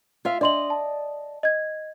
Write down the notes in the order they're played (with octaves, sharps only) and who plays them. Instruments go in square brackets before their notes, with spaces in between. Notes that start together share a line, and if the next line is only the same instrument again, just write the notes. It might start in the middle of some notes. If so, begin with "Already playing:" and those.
[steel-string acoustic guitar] F4 E5 F5
[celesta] D4 C6 F#7 [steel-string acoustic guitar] D5 D#5
[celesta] A5
D#5 G#6